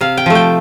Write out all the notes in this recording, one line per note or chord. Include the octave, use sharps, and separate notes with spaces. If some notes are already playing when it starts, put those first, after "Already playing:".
C3 F5
G5
F3 A3
G5